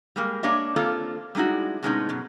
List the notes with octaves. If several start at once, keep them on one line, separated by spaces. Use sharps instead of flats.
G3 G#3 A#3
A#3 D4 G4 C#5 D#5 E5
A#3 C4 D4 F4 A4
G3 G#3 D#4 E4 F#4
A2 C3 G#3 B3 C#4 D#4
F#2 B2